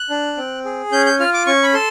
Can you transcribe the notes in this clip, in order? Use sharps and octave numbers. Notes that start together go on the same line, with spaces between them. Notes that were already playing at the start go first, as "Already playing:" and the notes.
Already playing: F#6
D4
C4
G#4
C#4 G6
G6
F4 F6
D6
C#4 C#6
B5
A4 C6